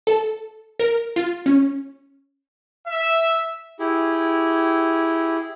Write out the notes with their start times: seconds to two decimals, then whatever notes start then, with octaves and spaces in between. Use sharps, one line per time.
0.07 A4
0.79 A#4
1.16 F4
1.46 C#4
2.87 E5
3.79 E4 G4 G#4